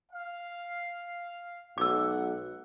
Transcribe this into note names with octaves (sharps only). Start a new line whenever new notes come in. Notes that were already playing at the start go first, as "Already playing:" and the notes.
F5
B1 F#5 D6 E6